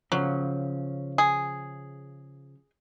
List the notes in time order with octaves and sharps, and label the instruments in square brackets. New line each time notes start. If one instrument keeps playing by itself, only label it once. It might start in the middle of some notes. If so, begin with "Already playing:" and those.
[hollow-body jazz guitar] C#3 F3 C#4 [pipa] F#3
[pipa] G#4